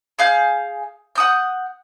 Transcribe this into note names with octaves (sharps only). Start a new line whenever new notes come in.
G#4 F5 G6
F#5 D#6 G6